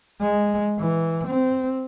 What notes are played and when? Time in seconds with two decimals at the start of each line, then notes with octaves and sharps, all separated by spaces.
0.21 G#3
0.79 E3
1.27 C4